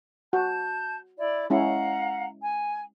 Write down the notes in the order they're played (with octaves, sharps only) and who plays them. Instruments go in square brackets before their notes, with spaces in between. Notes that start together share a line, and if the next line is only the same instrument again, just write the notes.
[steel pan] F#4 [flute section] A5 G6
[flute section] E4 D5
[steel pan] G#3 C#4 E4 [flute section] F5 F#5 A#5
[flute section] G#5